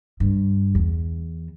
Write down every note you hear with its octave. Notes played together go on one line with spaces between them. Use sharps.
G2
E2